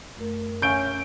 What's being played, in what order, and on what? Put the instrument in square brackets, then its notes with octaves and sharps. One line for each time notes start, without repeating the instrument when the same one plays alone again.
[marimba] F#2 A3 A#4
[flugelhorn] C#4 [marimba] E5 G#5 C#6 [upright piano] G6 D7